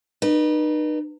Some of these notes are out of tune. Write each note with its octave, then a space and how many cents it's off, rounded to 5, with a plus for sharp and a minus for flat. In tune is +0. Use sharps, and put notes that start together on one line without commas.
D#4 -40 B4 -35